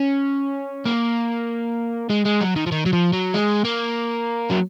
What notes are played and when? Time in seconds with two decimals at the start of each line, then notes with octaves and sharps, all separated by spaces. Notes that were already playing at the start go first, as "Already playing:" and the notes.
Already playing: C#4
0.85 A#3
2.10 G#3
2.26 G#3
2.41 F#3
2.56 D#3
2.67 F3
2.72 D#3
2.86 F#3
2.93 F3
3.13 F#3
3.34 G#3
3.65 A#3
4.50 F#3